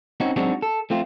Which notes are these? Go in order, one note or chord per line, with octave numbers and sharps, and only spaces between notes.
C4 C#4 D#4 F#4
F#3 G#3 C4 D4 D#4 F#4
A4
F3 A3 C4 F4